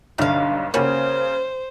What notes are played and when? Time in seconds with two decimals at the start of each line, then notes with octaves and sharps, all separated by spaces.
0.18 B1 G2 D3 A3 F5
0.74 C#3 G3 A#3 C#4 F#4 C5